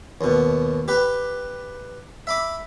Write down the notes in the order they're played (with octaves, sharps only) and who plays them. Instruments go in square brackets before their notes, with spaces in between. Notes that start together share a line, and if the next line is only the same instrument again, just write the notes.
[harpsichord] D#2 B2
G4 B4
E5 B5 D6